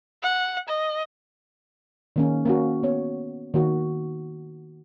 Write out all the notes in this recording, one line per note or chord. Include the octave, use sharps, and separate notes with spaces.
F#5
D#5
D#3 A#3 C#4
A#3 C#4 F#4
B3 C#5
D#3 A#3 F#4